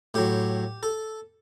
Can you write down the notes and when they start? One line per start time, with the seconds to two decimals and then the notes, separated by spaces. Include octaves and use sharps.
0.14 A2 F#3 G4
0.83 A4